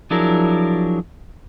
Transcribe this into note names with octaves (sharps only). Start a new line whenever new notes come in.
F3 F#3 D4 E4 G#4 A#4